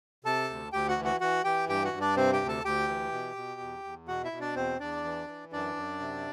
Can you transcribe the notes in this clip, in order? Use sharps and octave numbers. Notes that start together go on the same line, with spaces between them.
C3 A4 A5
D2
D2 G4 G5
F#4 F#5
E3
F#4 F#5
E3 F#4 F#5
E3 G4 G5
G2 G4 G5
F#4 F#5
G2
D4 D5
C3 C4 C5
G4 G5
D2
A4 A5
D2 G4 G5
E3
B2
B2
E2
E2
B2 F#4 F#5
E4 E5
B2
D4 D5
E2 C4 C5
E2 D4 D5
E3
E3
F#2 D4 D5
F#2
C3